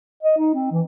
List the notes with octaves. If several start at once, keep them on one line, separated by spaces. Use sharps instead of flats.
D#5
D#4
C4
E3